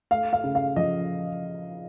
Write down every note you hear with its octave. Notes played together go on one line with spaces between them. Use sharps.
A3 F5
F5
C#3
F5
F3 D#5